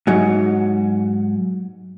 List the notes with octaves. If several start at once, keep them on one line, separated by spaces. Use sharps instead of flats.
G#2 F#3